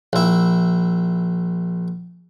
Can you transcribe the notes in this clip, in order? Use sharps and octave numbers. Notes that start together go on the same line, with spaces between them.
A#1 E4